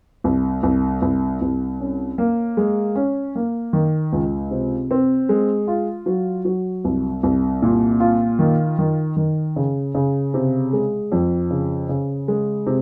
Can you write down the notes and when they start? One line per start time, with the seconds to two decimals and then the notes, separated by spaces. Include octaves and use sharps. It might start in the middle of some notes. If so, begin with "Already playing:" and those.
0.24 C2
0.63 C2
1.02 C2
1.41 C2
1.79 C#4
2.18 A#3
2.57 G#3
2.95 C#4
3.35 A#3
3.73 D#3
4.12 C#2
4.51 C3
4.91 C4
5.29 G#3
5.68 F4
6.06 F#3
6.45 F#3
6.84 C2
7.23 C2
7.62 A#2
8.00 F4
8.39 D#3
8.79 D#3
9.16 D#3
9.56 C#3
9.95 C#3
10.34 C3
10.73 G#3
11.12 F2
11.51 C#3
11.89 C#3
12.28 G#3
12.66 C3